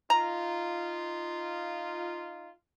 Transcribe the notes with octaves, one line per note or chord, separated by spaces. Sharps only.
D#4 F4 A#5